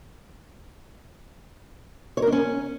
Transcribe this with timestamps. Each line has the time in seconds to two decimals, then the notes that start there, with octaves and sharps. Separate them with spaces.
2.17 C#5
2.22 A#4
2.27 D4
2.32 C#4